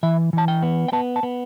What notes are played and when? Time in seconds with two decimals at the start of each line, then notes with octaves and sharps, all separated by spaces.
0.03 E3 E5
0.33 E3 A5
0.48 G5
0.62 B3
0.88 G5
0.93 B3 A5
1.16 A5
1.23 B3